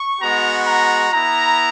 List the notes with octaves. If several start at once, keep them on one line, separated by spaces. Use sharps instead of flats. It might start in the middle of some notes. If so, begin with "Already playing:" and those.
Already playing: C#6
G#3 B3 F#4 A#5
A#5
B3 E4 A#5